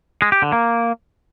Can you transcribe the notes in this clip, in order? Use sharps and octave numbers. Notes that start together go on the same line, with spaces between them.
G#3
G4
D3
A#3